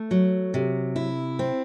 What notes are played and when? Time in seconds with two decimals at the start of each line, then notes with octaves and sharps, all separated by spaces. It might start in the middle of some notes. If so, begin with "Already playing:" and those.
Already playing: A3
0.11 F#3
0.54 C3
0.96 E4
1.39 C4